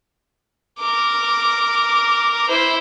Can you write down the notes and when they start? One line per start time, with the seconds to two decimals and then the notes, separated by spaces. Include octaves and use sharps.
0.79 A#4 D6
2.49 E4 C5